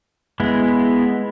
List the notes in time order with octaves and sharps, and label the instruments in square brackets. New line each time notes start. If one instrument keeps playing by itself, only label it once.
[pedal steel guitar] G#3 B3 E4